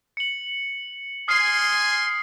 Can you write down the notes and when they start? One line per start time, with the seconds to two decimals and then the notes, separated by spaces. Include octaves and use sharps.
0.17 C#7 F#7
1.28 G#5 C6 D#6 F6 C7